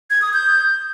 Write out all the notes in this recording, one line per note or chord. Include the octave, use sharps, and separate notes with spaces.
G#6
D#6
G6